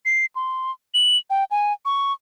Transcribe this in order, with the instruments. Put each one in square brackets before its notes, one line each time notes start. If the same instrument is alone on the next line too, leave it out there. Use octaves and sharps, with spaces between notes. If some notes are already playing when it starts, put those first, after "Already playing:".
[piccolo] C7
C6
F#7
G5
G#5
C#6